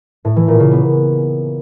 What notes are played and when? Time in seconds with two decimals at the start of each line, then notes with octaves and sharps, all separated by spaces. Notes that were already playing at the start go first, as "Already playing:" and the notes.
0.25 A2
0.36 E3
0.48 A#2
0.60 C#3
0.71 B3